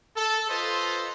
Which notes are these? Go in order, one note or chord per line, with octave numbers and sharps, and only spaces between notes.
A4
F4 A4 B4 C5 D#5